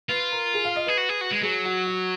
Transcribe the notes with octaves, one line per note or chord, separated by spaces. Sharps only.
F4 B4
A#4
G#4
F5
D#5
G#4 B4
F#4
G#4
F#4
G#3
F#3 G#4
F#4
F#4